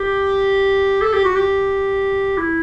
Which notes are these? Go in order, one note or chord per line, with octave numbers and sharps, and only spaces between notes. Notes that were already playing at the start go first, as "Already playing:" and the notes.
Already playing: G4
A4
G4
F#4
G4
E4